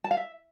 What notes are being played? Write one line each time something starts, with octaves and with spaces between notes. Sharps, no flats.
A5
F5
E5